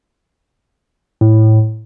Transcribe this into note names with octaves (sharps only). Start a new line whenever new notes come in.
A2